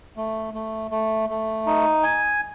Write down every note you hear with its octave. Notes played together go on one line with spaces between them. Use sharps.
A3
A3
A3
A3
D#4
G#5